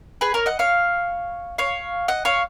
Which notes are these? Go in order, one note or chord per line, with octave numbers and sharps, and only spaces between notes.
G#4 B4
A#4 C#5
D#5 F#5
C#5 F5
C#5 F5
D#5 F#5
C#5 F5